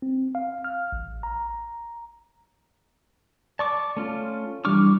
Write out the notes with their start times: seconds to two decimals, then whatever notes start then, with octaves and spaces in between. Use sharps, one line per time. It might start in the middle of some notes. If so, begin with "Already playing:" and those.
0.02 C4
0.35 F5
0.64 F6
0.92 A1
1.23 A#5
3.59 D5 A5 C#6 D6
3.97 A3 C#4 F4
4.65 E3 G3 D4 C#6 D6 F6